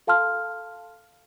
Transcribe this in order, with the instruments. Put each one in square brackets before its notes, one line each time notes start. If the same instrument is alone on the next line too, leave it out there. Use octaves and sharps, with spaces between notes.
[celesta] A4 F5 A5 C6 F6